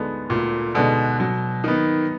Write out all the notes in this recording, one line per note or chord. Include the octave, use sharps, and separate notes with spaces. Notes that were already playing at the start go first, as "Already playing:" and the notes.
Already playing: D2 D3 G#3 B3 D#4
D2 A#2
B2 D3 G#3 B3 D#4
B2 F#3
D#3 B3 D#4